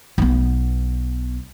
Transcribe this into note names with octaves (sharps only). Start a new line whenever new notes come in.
B1 B3